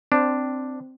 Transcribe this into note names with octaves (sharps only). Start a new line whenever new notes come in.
C4 D4